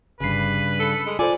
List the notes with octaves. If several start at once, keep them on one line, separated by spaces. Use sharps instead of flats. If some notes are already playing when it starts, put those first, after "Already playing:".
G1 G2 C#3 B4 C7
A4 C#7
G#3
F4 A4 C5 D5 G#5